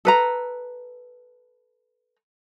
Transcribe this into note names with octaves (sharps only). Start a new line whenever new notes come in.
A4 B4 A#5